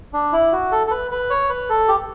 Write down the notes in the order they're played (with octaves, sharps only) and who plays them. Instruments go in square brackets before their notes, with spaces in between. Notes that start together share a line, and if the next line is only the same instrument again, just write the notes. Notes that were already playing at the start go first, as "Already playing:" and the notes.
[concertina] D4
E4
F#4
A4
A4
B4
B4
C#5
B4
A4
G4